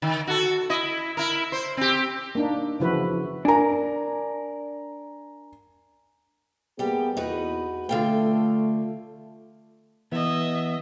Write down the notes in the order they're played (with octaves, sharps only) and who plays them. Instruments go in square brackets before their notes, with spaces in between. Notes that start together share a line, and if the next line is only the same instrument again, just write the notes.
[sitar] D#3
F#4 A4
E4 D#5
E4 A#4
C5
C4 G4
[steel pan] A#3 D4 D#4
C#3 E3 F3 E4 F#4 B4
[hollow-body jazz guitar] D4 A#4 [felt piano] G#5 A#5
[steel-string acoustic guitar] G3 G4 [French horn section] A#3 B3 G#4
[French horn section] E2 [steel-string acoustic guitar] D#4 F#4 B4
[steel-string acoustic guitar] D3 F4 G5 [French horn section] A3
[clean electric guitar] E3 B3 [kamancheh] D#5 E5